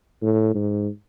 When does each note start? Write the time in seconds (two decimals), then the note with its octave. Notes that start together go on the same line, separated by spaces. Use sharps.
0.22 A2
0.55 G#2